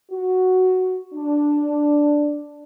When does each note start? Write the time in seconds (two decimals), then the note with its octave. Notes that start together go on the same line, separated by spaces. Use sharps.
0.10 F#4
1.13 D4